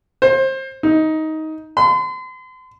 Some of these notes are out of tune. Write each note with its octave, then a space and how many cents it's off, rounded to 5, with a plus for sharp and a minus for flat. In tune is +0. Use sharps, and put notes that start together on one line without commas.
C5 +25
D#4 +15
C6 -40